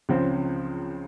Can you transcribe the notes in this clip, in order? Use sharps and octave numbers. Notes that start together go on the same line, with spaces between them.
C#2 C#3 F3 C4